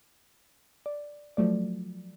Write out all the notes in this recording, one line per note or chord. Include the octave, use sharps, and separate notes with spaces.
D5
F3 F#3 A3 D5